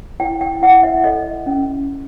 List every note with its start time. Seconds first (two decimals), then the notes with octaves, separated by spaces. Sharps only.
0.20 E4 G5
0.41 G5
0.62 E4 F#5
0.83 E5
1.04 A4 D#5
1.46 C#4